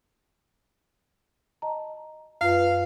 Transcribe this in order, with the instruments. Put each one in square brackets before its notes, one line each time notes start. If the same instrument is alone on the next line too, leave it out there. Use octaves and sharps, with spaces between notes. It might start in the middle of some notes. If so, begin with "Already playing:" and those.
[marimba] D#5 A5 A#5
[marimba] F#2 F4 B4 [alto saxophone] F5